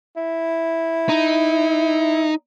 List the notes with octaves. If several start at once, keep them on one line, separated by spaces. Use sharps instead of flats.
E4
D#4